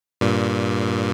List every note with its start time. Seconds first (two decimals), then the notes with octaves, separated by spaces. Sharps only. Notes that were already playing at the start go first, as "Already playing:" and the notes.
0.21 G2 A#2